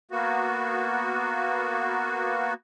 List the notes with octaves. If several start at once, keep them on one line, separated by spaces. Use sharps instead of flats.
A#3 B3 F#4